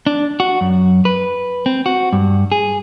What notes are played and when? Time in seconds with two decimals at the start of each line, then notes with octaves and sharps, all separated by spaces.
0.07 D4
0.40 F#4
0.61 F#2
1.05 B4
1.66 C4
1.86 F#4
2.13 G2
2.52 G#4